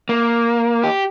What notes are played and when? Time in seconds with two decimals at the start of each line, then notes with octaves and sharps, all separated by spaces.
0.09 A#3
0.84 G4